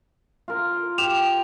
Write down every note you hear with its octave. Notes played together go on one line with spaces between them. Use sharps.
F4 A#4
G4 E7 F7